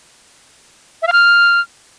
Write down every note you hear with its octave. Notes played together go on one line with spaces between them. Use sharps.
E5
F5
F6